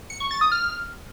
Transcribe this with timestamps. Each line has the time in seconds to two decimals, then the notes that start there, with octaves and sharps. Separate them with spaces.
0.10 C#7
0.20 C#6
0.31 A6
0.41 D#6
0.52 F6